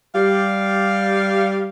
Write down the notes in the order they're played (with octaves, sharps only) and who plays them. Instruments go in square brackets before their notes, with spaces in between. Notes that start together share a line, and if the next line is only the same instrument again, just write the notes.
[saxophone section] G3 F5